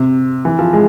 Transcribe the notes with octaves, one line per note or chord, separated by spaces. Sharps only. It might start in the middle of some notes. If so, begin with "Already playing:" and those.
Already playing: C3
E3
F3
G#3